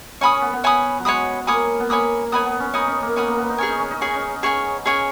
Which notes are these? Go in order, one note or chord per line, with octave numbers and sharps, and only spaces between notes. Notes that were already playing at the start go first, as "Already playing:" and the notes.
C#4 C#5 G#5 B5 D#6
C#4
B3
B3
C#5 G#5 B5 D#6
F#3
G#3 C#5 G#5 B5 D#6
A#3 C#5 G#5 B5 D#6
B3
A#3 C#5 G#5 B5 D#6
B3 C#5 G#5 B5 D#6
B3
C#4
D#4 C#5 G#5 B5 D#6
C#4
A#3
B3 C#5 G#5 B5 D#6
A#3
B3
D#4
C#4 G#4 C#5 G#5
D#4
C#4
D#4
C#4 G#4 C#5 G#5
C#4
C#4 G#4 C#5 G#5
C#4 G#4 C#5 G#5